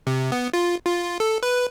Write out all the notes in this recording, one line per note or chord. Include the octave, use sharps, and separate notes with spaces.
C3
B3
F4
F4
A4
B4